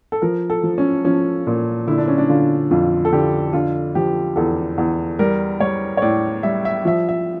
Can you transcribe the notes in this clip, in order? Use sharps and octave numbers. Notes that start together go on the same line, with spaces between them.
A4
F3 A#4
A4
F3
C#4
F3 C#4
A#2
D3 E4
D4
C#4
D4
D3 F4
F2 F4
A4
D3 G4
D3 F4
F3 G4
E2 A4
E2
G3 A#4
G3 C#5
C#5
A2 D5
G3 E5
E5
F3 E5
E5